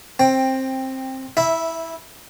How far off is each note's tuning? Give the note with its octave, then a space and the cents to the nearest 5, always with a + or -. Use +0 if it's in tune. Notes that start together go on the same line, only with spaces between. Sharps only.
C4 +15 G5 +10
E4 -20 E5 +0